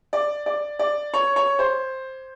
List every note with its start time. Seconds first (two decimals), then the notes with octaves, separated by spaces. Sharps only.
0.13 D5
0.46 D5
0.79 D5
1.14 C#5
1.36 C#5
1.59 C5